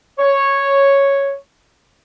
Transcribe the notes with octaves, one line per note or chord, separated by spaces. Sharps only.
C#5